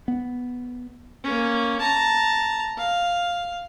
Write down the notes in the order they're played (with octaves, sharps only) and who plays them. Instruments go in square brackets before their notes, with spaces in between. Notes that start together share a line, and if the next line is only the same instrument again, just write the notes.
[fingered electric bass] B3
[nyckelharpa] A#3 C#4
A5 A#5
F5